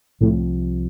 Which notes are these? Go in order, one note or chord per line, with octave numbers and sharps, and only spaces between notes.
C2 A2 C3 F3